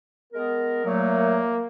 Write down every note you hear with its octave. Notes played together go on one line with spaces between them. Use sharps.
G#3 B3 A#4
A#2 F#3 A3 A#3